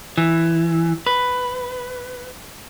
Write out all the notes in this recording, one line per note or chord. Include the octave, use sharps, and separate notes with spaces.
E3
B4